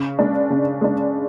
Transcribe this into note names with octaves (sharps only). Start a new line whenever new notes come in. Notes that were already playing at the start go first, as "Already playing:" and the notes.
Already playing: C#3
G#3 D4
C#3
G#3 D4